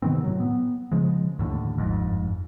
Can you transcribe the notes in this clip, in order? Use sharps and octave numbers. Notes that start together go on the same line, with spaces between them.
C3 D#3 B3 C4
A2 F#3
B3
C#3 F3 G#3
D#2 A2 D3
G1 F2 G#2